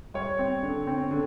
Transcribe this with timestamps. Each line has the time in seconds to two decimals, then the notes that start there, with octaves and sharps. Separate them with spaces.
0.14 G3 C#5
0.39 C4
0.63 D3
0.87 C4
1.11 D3